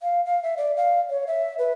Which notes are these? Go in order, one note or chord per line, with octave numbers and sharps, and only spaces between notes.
F5
F5
E5
D5
F5
C#5
E5
B4